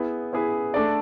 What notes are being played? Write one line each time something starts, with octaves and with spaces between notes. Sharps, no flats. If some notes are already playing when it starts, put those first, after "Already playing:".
Already playing: B3 E4 G#4 B4
B3 E4 G#4 B4
A3 D4 A4 D5